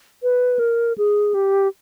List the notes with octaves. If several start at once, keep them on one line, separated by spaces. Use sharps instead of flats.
B4
A#4
G#4
G4